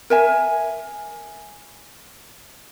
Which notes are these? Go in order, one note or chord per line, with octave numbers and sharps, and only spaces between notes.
A#4 E5 G#5